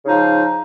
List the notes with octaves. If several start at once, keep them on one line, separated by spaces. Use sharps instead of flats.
C#3 F3 D#4